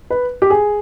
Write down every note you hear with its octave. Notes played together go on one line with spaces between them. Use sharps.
B4
G4
G#4